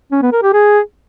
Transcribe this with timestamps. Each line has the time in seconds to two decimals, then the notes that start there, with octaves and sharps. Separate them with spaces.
0.12 C#4
0.22 B3
0.32 A#4
0.43 G4
0.53 G#4